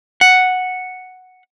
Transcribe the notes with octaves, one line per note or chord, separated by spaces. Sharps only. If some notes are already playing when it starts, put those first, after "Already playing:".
F#5